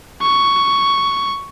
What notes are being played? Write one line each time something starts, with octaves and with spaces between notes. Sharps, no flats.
C#6